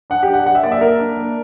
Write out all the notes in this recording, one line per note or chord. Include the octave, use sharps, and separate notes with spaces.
D4 F#5
G4
D4
F#5
D4 F#5
E5
A#3 D5
E5
A#3 A#4
D4
A#3